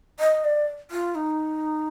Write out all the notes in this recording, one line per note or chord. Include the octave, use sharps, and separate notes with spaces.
D#5
D5
F4
D#4